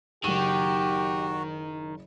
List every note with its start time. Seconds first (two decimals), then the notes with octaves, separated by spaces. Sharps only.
0.24 F#1 D#3 F#4 G4 D#7